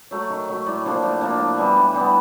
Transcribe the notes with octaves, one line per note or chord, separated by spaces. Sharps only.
F#3 A3
D#3
F#3 A3
A2 D5
F3 A#3 D4
A2
F3 A#3 D4
A2
E3 G3 B3
A2
E3 G3 B3